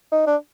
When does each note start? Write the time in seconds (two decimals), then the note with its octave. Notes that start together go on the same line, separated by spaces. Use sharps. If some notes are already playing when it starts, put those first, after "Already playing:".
0.12 D#4
0.27 D4